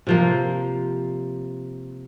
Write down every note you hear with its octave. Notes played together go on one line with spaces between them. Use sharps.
C3 F3 A#3